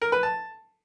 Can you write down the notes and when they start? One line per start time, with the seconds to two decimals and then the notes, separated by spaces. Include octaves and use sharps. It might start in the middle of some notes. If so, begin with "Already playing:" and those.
0.02 A#4
0.12 B4
0.23 A5